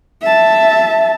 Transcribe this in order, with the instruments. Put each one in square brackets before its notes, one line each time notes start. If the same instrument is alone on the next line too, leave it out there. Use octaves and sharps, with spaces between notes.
[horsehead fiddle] E5 A5